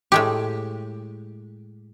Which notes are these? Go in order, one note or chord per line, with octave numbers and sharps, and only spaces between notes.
A2 G#3 G4